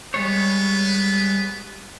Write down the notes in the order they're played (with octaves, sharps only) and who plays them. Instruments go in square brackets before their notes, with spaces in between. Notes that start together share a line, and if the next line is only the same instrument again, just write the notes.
[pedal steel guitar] G3 G#3 C#5 [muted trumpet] B3